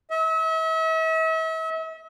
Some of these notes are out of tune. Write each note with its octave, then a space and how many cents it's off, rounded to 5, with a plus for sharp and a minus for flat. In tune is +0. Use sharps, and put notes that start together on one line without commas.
E5 -40